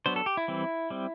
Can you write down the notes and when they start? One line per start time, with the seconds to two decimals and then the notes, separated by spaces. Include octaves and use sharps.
0.06 F#3 B3 D4 C5
0.16 A4
0.26 G4
0.37 E4
0.48 E3 G3 C4
0.90 G3 C4